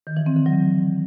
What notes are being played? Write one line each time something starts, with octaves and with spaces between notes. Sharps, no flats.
D#3
E3
C4
D3
F#3